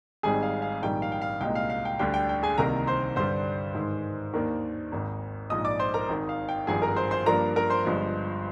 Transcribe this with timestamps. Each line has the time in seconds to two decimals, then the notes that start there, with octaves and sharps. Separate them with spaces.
0.23 G#1 G#2 G3 C4 D#4 G#4 G#5
0.43 F5
0.62 F5
0.82 A#1 G#2 D#3 G3 G5
1.02 F5
1.12 G5
1.22 F5
1.41 C2 A#2 G#3 D#4 G5
1.55 F5
1.70 F5
1.85 G5
1.99 D2 D3 G3 D4 G5
2.14 G5
2.29 G5
2.43 G#4 G#5
2.58 C2 C3 D#3 A#3 D#4 A#4 A#5
2.77 A#5
2.87 C5 C6
3.16 G2 D3 G3 D4 C5 C6
3.75 G#2 D#3 G#3
4.34 D#2 D#3 A#3 D4
4.92 G#1 G#2 D#3
5.50 A#1 G#2 F3 D#5 D#6
5.65 D5 D6
5.79 C5 C6
5.94 A#4 A#5
6.09 G#1 G#2 D#3
6.29 F5
6.49 G5
6.67 G#1 G2 F3 G#4 G#5
6.82 A#4 A#5
6.96 C5 C6
7.11 C5 C6
7.26 G2 F3 A#3 D4 A#4 A#5
7.56 A#4 A#5
7.70 C5 C6
7.85 G1 G2 F3 G#3